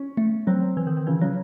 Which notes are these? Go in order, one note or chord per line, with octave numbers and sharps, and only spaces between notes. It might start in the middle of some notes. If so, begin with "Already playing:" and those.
Already playing: C#4
A3
F#3 C4
E3
D#3
D#3
C#3 E3
C#3 F#3